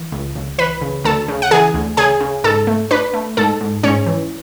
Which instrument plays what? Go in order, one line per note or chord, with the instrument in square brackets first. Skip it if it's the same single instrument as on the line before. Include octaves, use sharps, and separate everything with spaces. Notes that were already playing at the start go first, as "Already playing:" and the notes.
Already playing: [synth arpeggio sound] E3
C#2
C#2
E3 B4 B5
C#3
D2 A4 A5
C#3
F#5
E3 G#4 G#5
D2
C#3 G#4 G#5
C#3
G#2 A4 A5
A3
D4 B4 B5
A3
G#2 A4 A5
G#2
G#2 C#4 C#5
E3